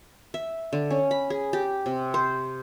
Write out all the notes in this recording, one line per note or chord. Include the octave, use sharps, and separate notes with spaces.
E5
D3
C#4
B5
G#4
G4
C3
C5